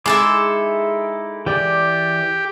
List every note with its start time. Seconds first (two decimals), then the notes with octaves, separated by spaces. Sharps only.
0.06 G#3 D#4 E4 A4 E5 D6
1.46 E3 G4 D5 D6